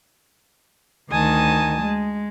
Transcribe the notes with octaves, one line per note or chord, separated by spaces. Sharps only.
D2 D#3 G#5 A5 D#6
G#3